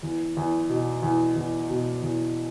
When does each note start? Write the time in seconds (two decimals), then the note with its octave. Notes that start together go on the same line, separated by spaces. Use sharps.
0.03 E2
0.37 E2
0.69 B2
1.03 E2
1.36 E2
1.70 B2
2.02 E2